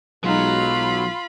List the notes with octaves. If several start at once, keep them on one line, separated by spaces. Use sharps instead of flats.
B1 F#3 G#3 D#4 F4 B5